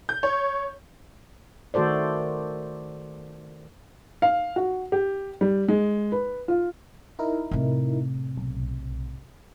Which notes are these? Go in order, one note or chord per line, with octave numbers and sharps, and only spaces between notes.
G6
C#5
D#3 A3 F#4 A4 C5 D5
F5
F#4
G4
G3
G#3
B4
F4
D#4 E4 A#4
A2 C3
B1